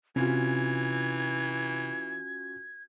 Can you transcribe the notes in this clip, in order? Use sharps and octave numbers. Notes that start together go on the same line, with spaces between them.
C3 E3 C#4 F4 F#4 G#6